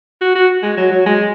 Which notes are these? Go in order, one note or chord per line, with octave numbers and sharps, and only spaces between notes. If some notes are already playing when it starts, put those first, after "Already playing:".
F#4
F#4
G#3
F#3
F#3
G#3